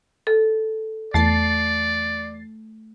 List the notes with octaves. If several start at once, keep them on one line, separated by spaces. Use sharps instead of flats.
A4
E2 A3 D5 A6 C7